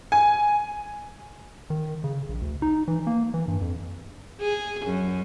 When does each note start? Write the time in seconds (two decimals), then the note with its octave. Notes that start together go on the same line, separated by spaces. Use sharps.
0.12 G#5
1.70 D#3
2.04 C#3
2.29 A#1
2.41 D2
2.62 D#4
2.88 E3
3.07 A#3
3.34 E3
3.48 G2
3.61 F2
4.41 G#4
4.86 F#2